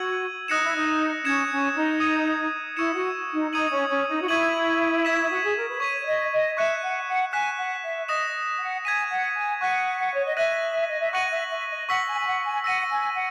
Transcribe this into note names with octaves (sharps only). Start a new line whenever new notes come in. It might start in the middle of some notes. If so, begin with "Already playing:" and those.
Already playing: F#4 E6 G#6 D#7 F#7
D#4 D#6 F#6 A#6 C#7 E7
E4
D#4
C#4 G#6 C#7 E7
C#4
D#4
D#6 G#6 D#7
E4 C#6 E6 G#6 C#7 E7
F#4
D#4
D#4 D#6 G#6 D#7 F#7
C#4
C#4
D#4
F#4
E4 C#6 G#6 D#7 F#7
G#6 B6 E7
F#4
G#4
A#4
B4
C#5 C#6 G#6 B6 D#7
C#5
D#5
D#5
E5 C#6 F#6 C#7 E7
F#5
F#5
G#5 F#6 B6 E7
F#5
E5
D#5 D#6 A#6 E7
F#5
G#5 G#6 B6 D#7
F#5
G#5
F#5 C#6 F#6 B6 D#7
C#5
D#5
E5 F#6 A#6 D#7 F#7
D#5
E5
F#5 C#6 F#6 A#6 D#7 F#7
E5
E5
D#5
F#5 C#6 E6 B6 F#7
G#5
G#5
F#5
G#5
F#5 E6 A#6 D#7
G#5
F#5